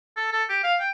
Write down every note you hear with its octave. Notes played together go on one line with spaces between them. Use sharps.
A4
A4
G4
F5
G5